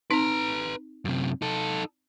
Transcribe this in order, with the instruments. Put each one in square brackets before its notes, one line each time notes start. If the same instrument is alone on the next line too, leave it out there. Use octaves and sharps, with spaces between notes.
[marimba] C4 D#4 [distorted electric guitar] B4 A#5
[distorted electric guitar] F#2 C3
D#4 A4